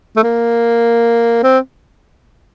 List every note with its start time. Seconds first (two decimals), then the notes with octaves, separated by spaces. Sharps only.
0.17 A3
0.23 A#3
1.43 C4